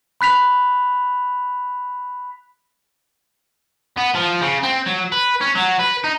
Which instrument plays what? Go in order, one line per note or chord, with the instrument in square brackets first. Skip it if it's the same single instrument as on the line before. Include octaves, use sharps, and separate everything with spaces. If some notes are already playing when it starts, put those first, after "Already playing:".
[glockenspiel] B5 F#6 B6 F7
[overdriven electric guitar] B3
F3
C#3
C4
F#3
B4
C#4
F#3
B4
D#4